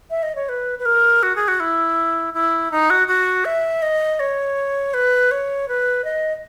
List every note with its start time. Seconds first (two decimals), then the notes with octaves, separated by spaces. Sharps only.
0.10 E5
0.23 D#5
0.35 C#5
0.49 B4
0.79 B4
0.85 A#4
1.23 F#4
1.36 G#4
1.48 F#4
1.60 E4
2.34 E4
2.71 D#4
2.90 F#4
3.08 F#4
3.45 E5
3.82 D#5
4.20 C#5
4.94 B4
5.31 C#5
5.68 B4
6.04 D#5